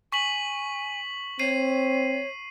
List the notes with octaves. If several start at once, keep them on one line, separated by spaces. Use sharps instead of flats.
G#5 C#6 B6 F#7
C4 C#5 C7 D#7